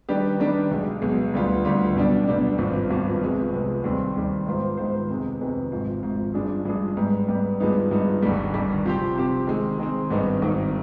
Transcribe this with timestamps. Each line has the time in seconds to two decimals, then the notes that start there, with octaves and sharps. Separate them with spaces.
0.09 D#3 G3 D4 G4 B4
0.40 D#3 G3 D4 G4 B4
0.71 B1 B2 G#3
1.02 B1 B2 G#3
1.33 D2 D3 G3 B3 F4
1.65 D2 D3 G3 B3 F4
1.96 B1 B2 G3 D4
2.28 B1 B2 G3 D4
2.58 G#1 G2 F3 B3
2.90 G#1 G2 F3 B3
3.21 C2 C3 F3 G#3 B3
3.52 C2 C3 F3 G#3 B3
3.84 D#2 D#3 G3 C4
4.15 D#2 D#3 G3 C4
4.46 G#2 D#3 B3 F4 C5
4.77 G#2 D#3 B3 F4 C5
5.09 F2 C3 D#3 G#3 B3
5.41 F2 C3 D#3 G#3 B3
5.72 G#1 G#2 F3
6.03 G#1 G#2 F3
6.34 G2 F3 G#3 D4 G#4
6.65 G2 F3 G#3 D4 G#4
6.97 G#2 G3 B3
7.29 G#2 G3 B3
7.60 G2 F3 G#3 B3 D#4
7.91 G2 F3 G#3 B3 D#4
8.22 G1 G2 D#3 G3
8.54 G1 G2 D#3 G3
8.84 C3 F3 C4 G4
9.16 C3 F3 C4 G4
9.47 D#3 G#3 C4
9.79 D#3 G#3 C4
10.10 G#1 G2 D#3 B3 D#4
10.42 G#1 G2 D#3 B3 D#4